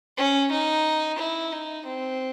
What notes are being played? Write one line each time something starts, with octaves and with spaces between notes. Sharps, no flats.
C#4
D#4
E4
D#4
C4